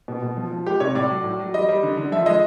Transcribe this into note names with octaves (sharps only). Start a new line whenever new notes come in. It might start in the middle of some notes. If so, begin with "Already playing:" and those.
B2
B2
F3
F3
G#3 G4
C3 C#5
A2 D5
F#3
A2
F#3
G3 D#5
G3
D3
D3
F3 E5
G#3 D#5